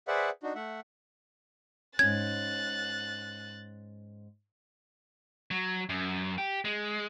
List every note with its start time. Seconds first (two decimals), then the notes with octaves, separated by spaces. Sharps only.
0.08 G#4 B4 C5 D5 E5 F#5
0.43 D4 D#4 F#4
0.55 A3 E5 F#5
1.99 G#2 C#4 F#6 G#6 A6
5.51 F#3
5.89 F#2
6.38 G4
6.65 G#3